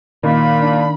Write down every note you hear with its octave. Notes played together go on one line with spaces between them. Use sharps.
A#2 D#3 B5
D4